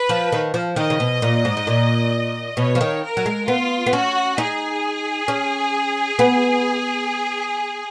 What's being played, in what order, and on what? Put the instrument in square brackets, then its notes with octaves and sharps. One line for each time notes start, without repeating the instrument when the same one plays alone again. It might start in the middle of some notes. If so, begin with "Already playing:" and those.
Already playing: [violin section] B4
[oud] F3
D#3
F3
[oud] D#3 [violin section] D#5
[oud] C#3
B2
A#2
G#2
G#2
A#2
[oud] B2 [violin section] C#5
[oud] F3
D#3
[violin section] A#4
[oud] F#3
G#3
[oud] B3 [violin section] F4
[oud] B3
[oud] C#4 [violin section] F#4
[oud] D#4 [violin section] G#4
[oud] C#4
B3